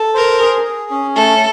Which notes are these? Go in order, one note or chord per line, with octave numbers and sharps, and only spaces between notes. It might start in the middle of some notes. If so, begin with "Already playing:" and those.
Already playing: A4
A#4 C5
G#4
G#4
C#4
A3 A4